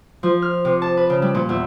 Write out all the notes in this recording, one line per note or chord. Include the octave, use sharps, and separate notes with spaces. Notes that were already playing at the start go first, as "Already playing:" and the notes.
F3
F6
C3
A5
B4
C#3
G3
A#2
E2